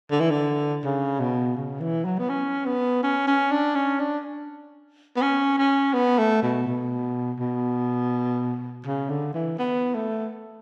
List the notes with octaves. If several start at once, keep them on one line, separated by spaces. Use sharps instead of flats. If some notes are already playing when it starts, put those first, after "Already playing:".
D3
E3
D3
C#3
B2
C#3
E3
F#3
B3
C#4
B3
C#4
C#4
D4
C#4
D4
B3
C#4
C#4
B3
A3
B2
B2
B2
C#3
D3
E3
B3
A3